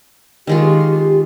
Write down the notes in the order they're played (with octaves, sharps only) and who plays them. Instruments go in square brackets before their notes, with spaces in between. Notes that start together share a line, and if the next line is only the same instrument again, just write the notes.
[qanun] D#3 G#3 F4 [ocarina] G4